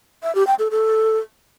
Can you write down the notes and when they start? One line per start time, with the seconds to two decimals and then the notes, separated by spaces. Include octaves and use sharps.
0.23 E5
0.35 G4
0.47 G5
0.59 A4
0.71 A4